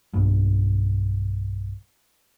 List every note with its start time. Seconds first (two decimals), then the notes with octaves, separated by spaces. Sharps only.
0.14 B1 G2